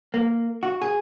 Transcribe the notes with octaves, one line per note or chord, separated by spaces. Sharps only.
A#3
F#4
G#4